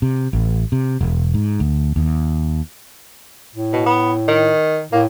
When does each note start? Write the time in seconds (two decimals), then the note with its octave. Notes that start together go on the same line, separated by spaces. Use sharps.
0.02 C3
0.33 A1
0.72 C3
1.01 E1
1.34 G#2
1.60 D2
1.96 D#2
3.55 A2
3.73 B2
3.86 B3
4.28 D#3
4.92 A2 A#3